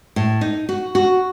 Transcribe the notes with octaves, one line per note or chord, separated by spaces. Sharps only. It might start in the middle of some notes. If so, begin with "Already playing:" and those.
A2
D#4
F#4
F#4